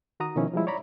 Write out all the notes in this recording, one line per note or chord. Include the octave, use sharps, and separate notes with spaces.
D#3 F#4 A#5 D#6
B2 D#3 F3 C#4 E4
F3 G3 G#3 E4
C#5 D5 A#5 B5